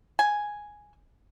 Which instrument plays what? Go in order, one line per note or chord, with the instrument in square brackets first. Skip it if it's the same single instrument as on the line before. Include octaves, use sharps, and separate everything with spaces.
[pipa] G#5